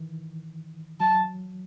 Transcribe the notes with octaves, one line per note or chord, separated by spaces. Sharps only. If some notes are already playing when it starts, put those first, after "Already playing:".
Already playing: D#3 E3
F#3 A5